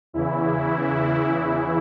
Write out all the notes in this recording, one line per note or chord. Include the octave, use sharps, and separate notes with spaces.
E2 C#3 E3 E4